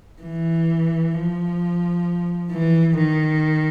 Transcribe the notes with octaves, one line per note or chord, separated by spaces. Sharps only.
E3
F3
E3
D#3